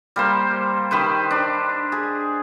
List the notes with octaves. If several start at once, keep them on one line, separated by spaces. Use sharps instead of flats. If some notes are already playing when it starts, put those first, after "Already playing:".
G3 A#3 C5
D#3 G4 B4 C5
D4
G#4